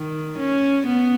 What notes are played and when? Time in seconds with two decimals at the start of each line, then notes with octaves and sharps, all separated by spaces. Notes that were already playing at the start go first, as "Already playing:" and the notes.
Already playing: D#3
0.39 C#4
0.87 B3